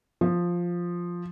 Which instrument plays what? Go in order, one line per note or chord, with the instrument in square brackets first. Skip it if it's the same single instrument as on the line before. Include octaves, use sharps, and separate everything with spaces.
[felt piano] F3